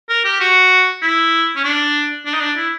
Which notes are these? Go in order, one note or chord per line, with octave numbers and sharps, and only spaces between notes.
A#4
G4
F#4
E4
C#4
D4
D4
D#4
D4
E4